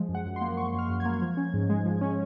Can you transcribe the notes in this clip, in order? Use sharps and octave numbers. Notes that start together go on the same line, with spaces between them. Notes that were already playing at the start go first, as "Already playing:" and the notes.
Already playing: F3 G#3
F#2
F#5
F#2
C6
A#3
F3 C#6
F#2
F6
F#2
G#6
A#3
F3
C#4
G#2
G#3
F3
C#4